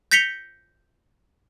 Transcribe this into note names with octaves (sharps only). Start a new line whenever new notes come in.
G6 A#6 B6 C#7 F7 G7